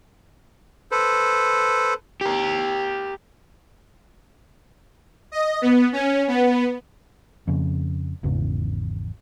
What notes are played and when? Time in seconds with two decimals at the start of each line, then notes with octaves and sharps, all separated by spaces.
0.91 A4 B4 C5
2.21 G4 A#4
5.32 D#5
5.62 B3
5.92 C#4
6.28 B3
7.48 F2 C#3
8.24 G#1 E2 C#3 E3